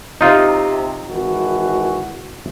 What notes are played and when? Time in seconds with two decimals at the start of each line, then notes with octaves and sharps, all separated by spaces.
0.21 C3 D#4 F4
1.08 G#1 E3 F#4